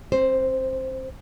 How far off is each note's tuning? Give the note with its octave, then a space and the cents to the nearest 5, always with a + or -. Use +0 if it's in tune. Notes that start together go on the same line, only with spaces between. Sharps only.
C4 +30 C5 +0